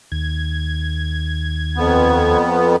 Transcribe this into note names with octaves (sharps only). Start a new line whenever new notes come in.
D#2 G#6
F2 B3